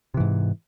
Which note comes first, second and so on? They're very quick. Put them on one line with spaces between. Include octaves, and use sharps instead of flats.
C3 E3 G#2